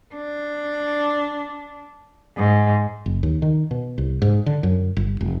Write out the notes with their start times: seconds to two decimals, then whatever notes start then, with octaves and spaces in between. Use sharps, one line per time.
0.14 D4
2.36 G#2
3.06 F#1
3.23 D#2
3.42 D#3
3.71 B2
3.98 C2
4.22 G#2
4.46 D3
4.63 F#2
4.97 G1
5.21 F1